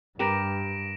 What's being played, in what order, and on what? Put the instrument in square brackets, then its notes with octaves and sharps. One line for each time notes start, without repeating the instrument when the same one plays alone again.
[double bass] G2 [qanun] G4 A#4 B4 [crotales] A#6 D7 E7